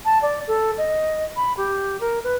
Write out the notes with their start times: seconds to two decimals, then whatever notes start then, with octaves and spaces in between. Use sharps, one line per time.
0.05 A5
0.22 D5
0.48 A4
0.78 D#5
1.36 B5
1.57 G4
2.01 A#4
2.24 B4